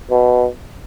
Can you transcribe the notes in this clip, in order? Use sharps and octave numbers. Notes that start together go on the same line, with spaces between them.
B2